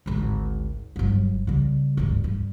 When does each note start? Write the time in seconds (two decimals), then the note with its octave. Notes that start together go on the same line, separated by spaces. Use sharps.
0.06 G#1 D2
0.96 G1 F#3
1.47 C#3 G3
1.97 D1 G2
2.24 G2